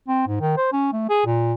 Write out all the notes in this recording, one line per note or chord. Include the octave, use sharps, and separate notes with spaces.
C4
G#2
D#3
C5
C#4
A3
G#4
A#2